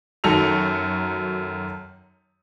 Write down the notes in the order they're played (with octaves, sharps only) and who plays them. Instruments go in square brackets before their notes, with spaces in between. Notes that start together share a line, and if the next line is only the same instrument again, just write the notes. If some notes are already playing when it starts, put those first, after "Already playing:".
[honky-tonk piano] F#2 D#3 F#4 A4 F7